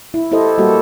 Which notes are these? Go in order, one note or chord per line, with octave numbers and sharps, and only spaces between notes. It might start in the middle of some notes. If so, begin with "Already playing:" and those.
E4
E4 G4 A4 C5 D#5
G3 A#3 F#4 G4 A4